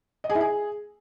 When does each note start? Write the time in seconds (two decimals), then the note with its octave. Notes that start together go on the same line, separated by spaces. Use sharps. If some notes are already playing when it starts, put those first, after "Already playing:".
0.24 D#5
0.30 G#4
0.35 E4
0.41 G#4